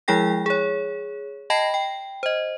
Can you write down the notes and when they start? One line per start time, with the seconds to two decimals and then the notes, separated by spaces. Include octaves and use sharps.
0.08 F3 G#3 E4 G#4 G5 A#6
0.46 G#4 C#5
1.50 D#5 G5 A5 B5 A#6 C7
1.74 G5
2.23 C5 D#5